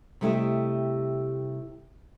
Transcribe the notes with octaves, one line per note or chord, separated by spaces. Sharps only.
C3 G3 A3 E4 G4 D#5